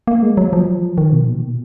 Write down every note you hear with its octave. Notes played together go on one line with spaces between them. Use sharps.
A#3
G#3
F#3
F3
D#3
B2
A#2
B2